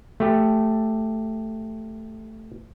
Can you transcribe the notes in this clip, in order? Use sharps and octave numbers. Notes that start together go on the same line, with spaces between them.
A3 G4